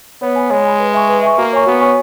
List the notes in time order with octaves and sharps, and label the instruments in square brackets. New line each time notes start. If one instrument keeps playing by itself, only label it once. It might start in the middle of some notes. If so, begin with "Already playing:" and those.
[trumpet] B3 [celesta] C#5
[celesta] G#5 B5
[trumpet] G#3 [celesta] C#5
[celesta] G#5 B5
B4
E5 G#5 C#6
B4
E5 G#5 C#6
[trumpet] A#3 [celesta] F#4
[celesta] C#5 G#5 C#6
[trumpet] B3 [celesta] F#4
[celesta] C#5 G#5 C#6